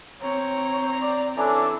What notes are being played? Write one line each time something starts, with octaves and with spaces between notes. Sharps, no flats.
C4 C#5 A#5
D5
E3 C#4 D4 A4